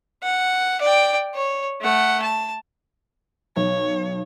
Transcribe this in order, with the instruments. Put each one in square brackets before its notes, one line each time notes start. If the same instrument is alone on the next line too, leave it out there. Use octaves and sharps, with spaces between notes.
[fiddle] F#5
D5 G5
C#5
A3 F#5
A5
[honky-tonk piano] B1 [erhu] C#5